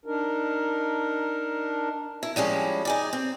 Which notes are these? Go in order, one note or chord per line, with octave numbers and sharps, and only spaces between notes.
D4 D#4 A#4
E4
F3 G3 G#3 C#4
D#4 G#4 D5
C4